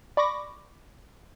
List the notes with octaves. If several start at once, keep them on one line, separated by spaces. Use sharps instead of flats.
D5 B5 C#6 D6 A#6